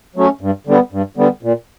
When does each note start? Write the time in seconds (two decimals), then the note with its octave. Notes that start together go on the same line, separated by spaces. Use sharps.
0.16 F#3 A3 C#4
0.41 G2
0.67 D3 G3 B3
0.92 G2
1.17 D3 G3 B3
1.43 A#2